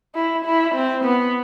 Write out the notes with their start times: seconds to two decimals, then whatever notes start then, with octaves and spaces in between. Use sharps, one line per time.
0.15 E4
0.45 E4
0.75 C4
1.04 B3